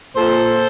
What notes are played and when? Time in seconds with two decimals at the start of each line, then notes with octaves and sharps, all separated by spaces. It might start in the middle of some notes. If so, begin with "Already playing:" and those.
0.16 A#2 A4 C5